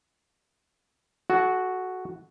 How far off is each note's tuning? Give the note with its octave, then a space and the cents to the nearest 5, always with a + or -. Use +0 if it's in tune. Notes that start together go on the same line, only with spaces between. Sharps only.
F#4 +0 A4 -35